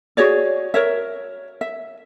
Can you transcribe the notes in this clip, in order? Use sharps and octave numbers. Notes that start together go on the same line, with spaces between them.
F#4 G#4 C#5 D5
A#4 C#5 E5
E5